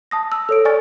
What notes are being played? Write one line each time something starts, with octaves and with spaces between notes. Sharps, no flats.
A5 D#6 A#6
E6
A4 C#5 D7
D5 G#5 C#6 F6 A6